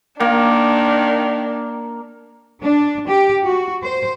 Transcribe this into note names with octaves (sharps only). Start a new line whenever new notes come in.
D#3 A#3 D4
D4
G4
F#4
C5